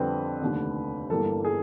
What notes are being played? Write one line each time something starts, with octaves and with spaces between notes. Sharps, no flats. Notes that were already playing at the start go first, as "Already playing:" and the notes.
Already playing: F2 D3 G3 C4 B4
F1 D#2 D3
G1 G2 E3 G3 A#3 A4
G#4